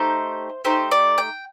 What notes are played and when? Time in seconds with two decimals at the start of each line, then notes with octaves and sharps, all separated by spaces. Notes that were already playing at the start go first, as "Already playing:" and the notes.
Already playing: A3 D#4 G4 C5
0.65 A3 D#4 G4 C5
0.91 D5
1.18 G5